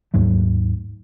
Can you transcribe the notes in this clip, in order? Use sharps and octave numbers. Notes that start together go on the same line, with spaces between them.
D#2 G#2 F#3 A3